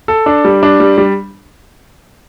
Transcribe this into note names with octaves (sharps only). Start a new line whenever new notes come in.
A4
D4
G3
D4
G3
G3